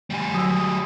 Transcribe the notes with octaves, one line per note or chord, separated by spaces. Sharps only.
G3 G#4
F#3 D#6 E6